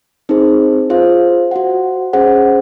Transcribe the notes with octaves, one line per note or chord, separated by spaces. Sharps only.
C4 D#4 G#4 C5
F4 G#4 C5 F5
F#4 C5 F#5
C#4 G#4 C5 F#5